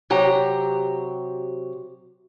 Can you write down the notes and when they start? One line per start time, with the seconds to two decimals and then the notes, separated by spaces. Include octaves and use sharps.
0.10 C3 F#3 G4 A#5